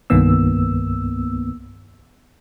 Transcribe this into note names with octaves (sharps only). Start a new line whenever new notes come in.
C2 G2 D#3 A#3 B3 E6